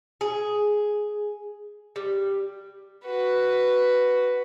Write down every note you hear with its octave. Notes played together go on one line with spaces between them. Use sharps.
G#4
G3
F#4 B4